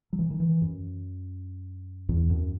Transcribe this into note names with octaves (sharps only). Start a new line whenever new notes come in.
F#3
E3
D#3
E3
F#2
E2
F#2